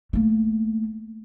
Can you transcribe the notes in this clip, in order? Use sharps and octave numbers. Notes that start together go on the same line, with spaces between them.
A3 A#3